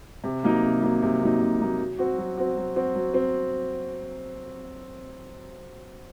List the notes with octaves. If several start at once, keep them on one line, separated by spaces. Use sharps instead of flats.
C3
F#3 A#3 D#4
C3
F#3 A#3 D#4
C3
F#3 A#3 D#4
C3
F#3 A#3 D#4
F#3
C4 F#4
F#3
C4 F#4
F#3
C4 F#4
F#3
C4